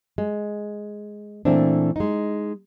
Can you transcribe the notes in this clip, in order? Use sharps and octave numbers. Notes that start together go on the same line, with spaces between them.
G#3
A#2 E3 A3 C4 D4
G#3 D#4